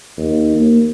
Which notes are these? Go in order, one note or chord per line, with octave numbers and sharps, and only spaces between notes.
D#2
A#3